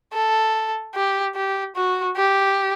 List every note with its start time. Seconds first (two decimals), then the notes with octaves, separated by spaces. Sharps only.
0.14 A4
0.95 G4
1.35 G4
1.76 F#4
2.16 G4